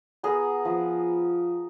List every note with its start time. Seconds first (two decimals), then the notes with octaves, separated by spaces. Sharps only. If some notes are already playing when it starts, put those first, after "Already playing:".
0.23 B3 G#4 A#4
0.65 F3